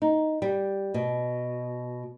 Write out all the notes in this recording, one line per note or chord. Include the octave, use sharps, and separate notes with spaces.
D#4
G3
B2